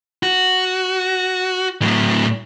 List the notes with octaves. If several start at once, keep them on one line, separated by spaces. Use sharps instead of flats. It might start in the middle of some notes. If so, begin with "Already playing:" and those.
F#4
A2 F#3